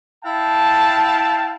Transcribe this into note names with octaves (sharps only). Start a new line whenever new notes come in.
E4 F5 G5 A5